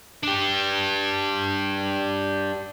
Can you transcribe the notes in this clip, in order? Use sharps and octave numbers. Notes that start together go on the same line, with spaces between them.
D4 G4